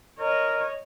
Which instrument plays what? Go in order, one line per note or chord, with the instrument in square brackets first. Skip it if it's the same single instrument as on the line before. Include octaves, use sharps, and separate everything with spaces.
[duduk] A#4 [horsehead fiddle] C#5 D#5